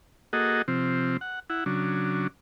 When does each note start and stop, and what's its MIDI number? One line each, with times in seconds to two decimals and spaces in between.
0.33 0.62 58
0.33 0.62 66
0.33 0.62 68
0.33 0.62 69
0.33 0.62 75
0.33 0.62 78
0.68 1.17 48
0.68 1.17 53
0.68 1.17 60
1.21 1.40 78
1.50 1.64 64
1.50 1.64 78
1.66 2.27 49
1.66 2.27 54
1.66 2.27 62